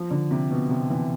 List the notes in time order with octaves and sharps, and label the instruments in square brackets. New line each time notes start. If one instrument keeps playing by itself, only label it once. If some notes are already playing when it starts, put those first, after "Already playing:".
Already playing: [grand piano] F3
D3
C3
B2
C3
E3